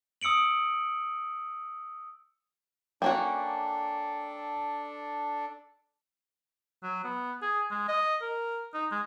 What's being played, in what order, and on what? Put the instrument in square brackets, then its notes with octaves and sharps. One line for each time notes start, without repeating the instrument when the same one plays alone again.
[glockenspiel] D#6 E6 C#7 D7 F#7
[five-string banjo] A#3 C#4 F#4 [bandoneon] D4 A4 [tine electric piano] G5
[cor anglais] F#3
B3
G#4
G#3
D#5
A#4
D#4
G#3